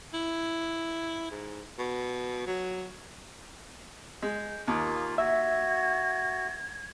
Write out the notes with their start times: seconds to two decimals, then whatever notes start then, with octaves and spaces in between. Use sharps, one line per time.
0.14 E4
1.31 G#2
1.79 B2
2.47 F#3
4.22 G#3 G6
4.68 D#2 A#3 F4 D#6
5.18 F#4 E5 G#6